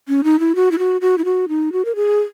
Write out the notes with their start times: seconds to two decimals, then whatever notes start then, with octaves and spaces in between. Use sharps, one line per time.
0.08 C#4
0.24 D#4
0.39 E4
0.55 F#4
0.71 E4
0.79 F#4
1.01 F#4
1.18 E4
1.25 F#4
1.48 D#4
1.72 F#4
1.85 A#4
1.95 G#4